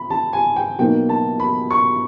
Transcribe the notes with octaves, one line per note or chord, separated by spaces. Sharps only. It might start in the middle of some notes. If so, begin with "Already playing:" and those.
Already playing: B5
A5
G#5
G5
B2 F#3 A#3 D#4 G5
A5
B5
C#6